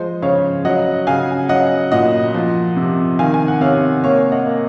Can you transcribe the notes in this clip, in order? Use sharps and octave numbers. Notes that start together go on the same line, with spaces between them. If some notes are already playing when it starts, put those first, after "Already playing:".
Already playing: F3 G#3 C5 D#5
C#3 C#5 F5
F#3 D#5 F#5
C#3 F5 G#5
F#3 D#5 F#5
A#2 D#5 F#5
F3
C3
D#3 F5 G#5
G#5
F#5
C3 C#5 F5
A#3 C#5 F5
D#5 F#5
A#3